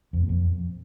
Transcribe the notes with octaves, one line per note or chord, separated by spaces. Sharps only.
F2
A#2
F2